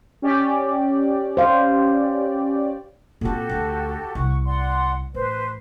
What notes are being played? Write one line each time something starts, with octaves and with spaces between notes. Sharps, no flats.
C#4 G4 D5
C5 F5
A#2 C4 F#4 G4 A4
D2
C2 F#5 C#6
D5 F#5 C6
A1 B4 C5